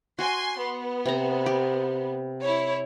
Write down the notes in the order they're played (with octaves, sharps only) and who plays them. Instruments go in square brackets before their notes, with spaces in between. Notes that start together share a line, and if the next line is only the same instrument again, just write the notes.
[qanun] F#4 [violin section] G#5 C6
[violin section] B3
[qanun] C3 A#5
G4
[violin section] E4 C#5